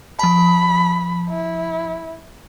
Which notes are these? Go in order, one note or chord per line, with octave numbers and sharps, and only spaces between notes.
F3 A5 B5
E4